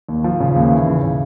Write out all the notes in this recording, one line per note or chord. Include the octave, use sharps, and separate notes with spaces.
D#2
F3
C#3
D#2
E3
C#3
C#3